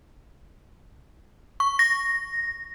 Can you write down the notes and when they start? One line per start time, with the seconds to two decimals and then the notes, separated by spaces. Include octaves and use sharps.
1.60 C#6
1.79 A#6